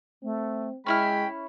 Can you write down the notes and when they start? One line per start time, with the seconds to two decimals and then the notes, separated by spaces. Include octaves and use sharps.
0.23 A3 C4
0.86 G#3 C#4 E4 G5 B5 F6